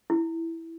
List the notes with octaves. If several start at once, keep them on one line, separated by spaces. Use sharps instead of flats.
E4